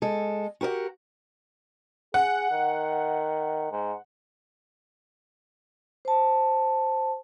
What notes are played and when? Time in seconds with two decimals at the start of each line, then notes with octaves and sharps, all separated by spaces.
0.02 G#3 A4
0.61 F#4 G4 A#4 C#5 F#5
2.14 G#4 F#5
2.51 D#3
3.72 G#2
6.05 C5 A5